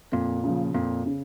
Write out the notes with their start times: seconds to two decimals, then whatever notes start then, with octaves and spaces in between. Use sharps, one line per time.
0.12 F2 A#2
0.44 C#3 F3
0.74 F2 A#2
1.06 C#3